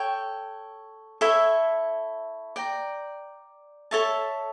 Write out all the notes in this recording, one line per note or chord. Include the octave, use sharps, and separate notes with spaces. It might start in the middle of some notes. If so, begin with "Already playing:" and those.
Already playing: A4 C#5 G5
E4 A4 C#5 E5
D5 G5 A#5
A4 C#5 E5 A5